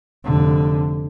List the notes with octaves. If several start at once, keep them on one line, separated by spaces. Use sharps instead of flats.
F1 D3